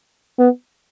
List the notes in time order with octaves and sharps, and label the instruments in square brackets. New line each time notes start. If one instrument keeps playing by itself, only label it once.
[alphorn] B3